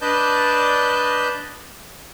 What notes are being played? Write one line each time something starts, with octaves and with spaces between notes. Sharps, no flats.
D4 B4 D5 D#5 A5 G6